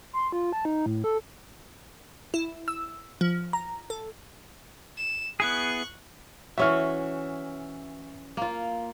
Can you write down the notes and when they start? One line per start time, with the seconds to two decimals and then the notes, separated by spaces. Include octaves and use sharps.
0.13 C6
0.32 F4
0.52 A5
0.65 D#4
0.86 A2
1.04 A4
2.34 E4
2.68 E6
3.21 F3
3.53 A#5
3.90 A4
4.97 E7
5.40 B3 E4 G#4 C#6 F#6
6.58 E3 C#4 F#4 E5 C#6 F6
8.37 A#3 F4